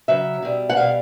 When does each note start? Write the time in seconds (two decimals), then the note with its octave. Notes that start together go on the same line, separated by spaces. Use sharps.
0.08 C#3 F#3 E5
0.42 B2 G3
0.70 F#5
0.76 B2 G3 F5